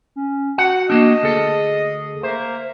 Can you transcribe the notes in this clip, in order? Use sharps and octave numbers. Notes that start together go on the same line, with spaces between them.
C#4
F#4 F#5
A#3 D4 D#5
D2 G#4 A4
A#3 C5 E5